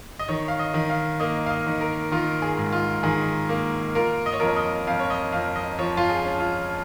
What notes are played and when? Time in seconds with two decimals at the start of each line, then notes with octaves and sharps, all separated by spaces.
0.19 D#5
0.28 D#3 C#5
0.48 F5
0.59 D#5
0.74 D#3
0.90 F5
1.20 A#3 D#5
1.46 F5
1.50 D#5
1.66 D#3
1.81 A#4
2.11 D#3 F4
2.42 G#4
2.57 G#2
2.72 F4
3.03 D#3 G#4
3.49 A#3
3.95 F4 A#4
4.26 D#5
4.33 C#5
4.40 F2 A#4
4.47 C#5
4.57 D#5
4.87 F2 F5
4.99 C#5
5.10 D#5
5.33 F2 F5
5.56 D#5
5.79 F3 C#5
5.97 F4
6.10 G#4
6.25 C#4
6.39 F4